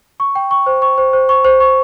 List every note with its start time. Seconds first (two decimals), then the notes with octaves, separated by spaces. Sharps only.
0.20 C#6
0.35 G5
0.51 C#6
0.66 C5
0.82 C#6
0.98 C5
1.13 C5
1.29 C#6
1.45 C5
1.60 C#6